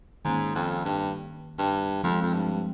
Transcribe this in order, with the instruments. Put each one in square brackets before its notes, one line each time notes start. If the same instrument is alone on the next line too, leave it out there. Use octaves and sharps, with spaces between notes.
[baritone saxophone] G#2 [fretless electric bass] D#3 A#3 C#4
[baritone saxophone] F2
G2
G2
[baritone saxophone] F2 [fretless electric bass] F3 G#3 C4
[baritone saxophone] F2
G2